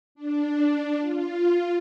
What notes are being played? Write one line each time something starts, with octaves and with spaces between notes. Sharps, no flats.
D4
F4